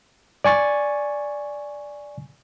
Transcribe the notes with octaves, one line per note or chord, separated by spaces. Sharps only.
D5 G#5 C#6 A6